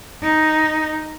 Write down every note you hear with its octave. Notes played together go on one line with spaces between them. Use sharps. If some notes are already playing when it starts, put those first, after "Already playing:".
D#4